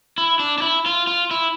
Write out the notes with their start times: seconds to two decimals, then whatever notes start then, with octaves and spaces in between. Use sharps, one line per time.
0.18 E4
0.39 D4
0.58 D4
0.62 E4
0.86 F4
1.07 F4
1.31 E4